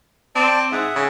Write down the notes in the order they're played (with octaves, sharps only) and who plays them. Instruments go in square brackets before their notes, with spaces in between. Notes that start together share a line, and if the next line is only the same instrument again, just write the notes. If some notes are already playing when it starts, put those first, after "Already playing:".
[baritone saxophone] C4 [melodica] D5 A5
[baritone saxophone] G#2 [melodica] E5 F#5 D#6
[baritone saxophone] C#3